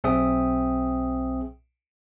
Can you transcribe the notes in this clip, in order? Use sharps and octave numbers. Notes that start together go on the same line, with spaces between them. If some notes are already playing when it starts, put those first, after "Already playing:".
B1 C4 G#4 E5 G5 D#6